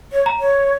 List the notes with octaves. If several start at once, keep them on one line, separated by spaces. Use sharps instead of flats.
C#5
A#5
C#5